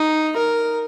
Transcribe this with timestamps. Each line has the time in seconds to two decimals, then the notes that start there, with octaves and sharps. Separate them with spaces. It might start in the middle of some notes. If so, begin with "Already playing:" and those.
Already playing: D#4
0.37 A#4